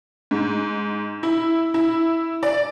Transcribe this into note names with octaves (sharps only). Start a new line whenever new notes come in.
G#2
E4
E4
D5